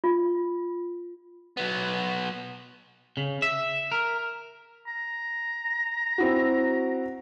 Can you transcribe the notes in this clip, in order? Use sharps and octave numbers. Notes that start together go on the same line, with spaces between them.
F4
F#3 B3
C#3
E5
A#4
A#5
C4 E4 F#4